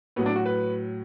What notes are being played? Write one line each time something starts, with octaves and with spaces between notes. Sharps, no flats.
A2 F#3 B3
D4
F#4
B4